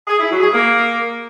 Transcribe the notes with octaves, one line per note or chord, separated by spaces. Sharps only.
G#4
E4
F#3
G#4
A#3